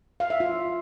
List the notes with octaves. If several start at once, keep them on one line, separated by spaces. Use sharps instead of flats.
F5
E5
F4